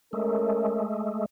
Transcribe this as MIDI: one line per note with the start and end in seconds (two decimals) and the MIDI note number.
0.13 1.26 56
0.13 1.26 57
0.13 0.84 61
0.13 0.84 69
0.13 0.84 70